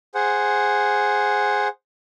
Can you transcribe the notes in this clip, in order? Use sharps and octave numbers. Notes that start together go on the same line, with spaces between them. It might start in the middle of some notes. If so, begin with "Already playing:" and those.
G#4 C5 F#5